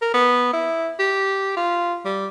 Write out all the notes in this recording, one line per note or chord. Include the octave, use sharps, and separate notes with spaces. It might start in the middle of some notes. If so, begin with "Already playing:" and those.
A#4
B3
E4
G4
F4
G3